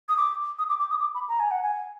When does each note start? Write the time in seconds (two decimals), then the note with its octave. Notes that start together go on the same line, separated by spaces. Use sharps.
0.09 D#6
0.17 D6
0.59 D#6
0.69 D6
0.80 D6
0.90 D#6
1.00 D6
1.15 B5
1.29 A#5
1.40 G#5
1.51 F#5
1.63 G#5